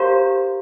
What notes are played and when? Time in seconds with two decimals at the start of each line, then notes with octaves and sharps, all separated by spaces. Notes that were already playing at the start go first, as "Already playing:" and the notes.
Already playing: G4 A#4 C5 F5 A#5